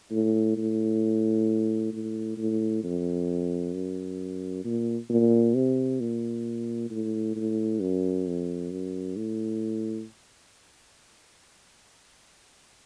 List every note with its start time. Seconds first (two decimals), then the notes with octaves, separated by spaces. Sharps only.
0.11 A2
0.57 A2
1.93 A2
2.37 A2
2.83 F2
3.74 F#2
4.65 A#2
5.09 A#2
5.55 C3
6.00 A#2
6.90 A2
7.36 A2
7.81 F#2
8.27 F2
8.71 F#2
9.17 A2